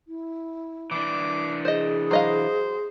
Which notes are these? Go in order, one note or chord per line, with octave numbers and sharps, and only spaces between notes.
E4
E3 D4 D6
G#4 C5 D#5
F#3 C5 D#5 F5